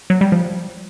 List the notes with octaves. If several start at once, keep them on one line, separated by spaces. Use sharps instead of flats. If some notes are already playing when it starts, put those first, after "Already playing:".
F#3
G3
F3